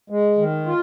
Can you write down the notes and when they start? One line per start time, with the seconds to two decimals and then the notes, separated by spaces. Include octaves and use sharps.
0.10 G#3
0.38 D#3
0.66 F4